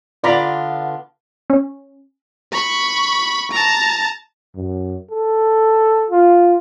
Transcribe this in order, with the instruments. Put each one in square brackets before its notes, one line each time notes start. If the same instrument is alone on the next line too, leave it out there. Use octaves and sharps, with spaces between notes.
[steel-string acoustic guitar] D3 B3 F4 [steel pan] D5 A#5 B5
[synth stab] C#4
[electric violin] B5 C#6
A5 A#5
[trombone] F#2
A4
F4